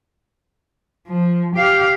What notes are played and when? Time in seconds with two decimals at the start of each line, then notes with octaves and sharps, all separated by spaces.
1.07 F3
1.56 G4 F5